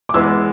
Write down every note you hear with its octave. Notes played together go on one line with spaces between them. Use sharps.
D6
E3 G#3 B3 E6